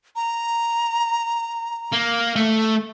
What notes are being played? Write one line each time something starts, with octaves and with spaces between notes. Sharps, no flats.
A#5
A#3
A3